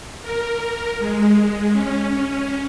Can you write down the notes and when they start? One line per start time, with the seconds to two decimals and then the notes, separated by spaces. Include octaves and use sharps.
0.22 A#4
0.99 G#3
1.73 C#4